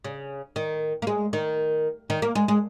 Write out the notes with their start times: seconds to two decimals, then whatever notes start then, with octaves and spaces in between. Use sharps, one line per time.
0.04 C#3
0.56 D#3
1.02 A#3
1.07 G#3
1.33 D#3
2.10 D#3
2.22 A#3
2.35 G#3
2.48 G#3